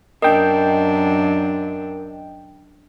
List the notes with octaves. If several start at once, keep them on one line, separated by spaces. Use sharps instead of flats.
F#2 D4 A#4 D#5 G5